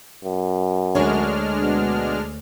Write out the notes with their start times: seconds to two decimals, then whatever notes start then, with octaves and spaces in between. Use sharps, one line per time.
0.24 F#2
0.95 D2 G#3 D4 C#5 F6
1.61 B2